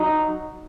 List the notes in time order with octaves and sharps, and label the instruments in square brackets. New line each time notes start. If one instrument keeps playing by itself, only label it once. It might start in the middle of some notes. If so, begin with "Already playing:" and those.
Already playing: [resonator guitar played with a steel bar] F#3 [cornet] D#4